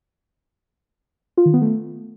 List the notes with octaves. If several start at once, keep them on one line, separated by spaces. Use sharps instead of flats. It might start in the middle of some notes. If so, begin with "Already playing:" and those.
F4
D#3
B3
A3